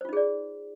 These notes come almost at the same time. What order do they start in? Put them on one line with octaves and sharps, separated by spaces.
C5 F4 D#4 G#4 D5